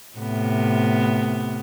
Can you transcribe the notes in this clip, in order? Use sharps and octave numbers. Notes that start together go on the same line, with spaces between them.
A2 C3 B3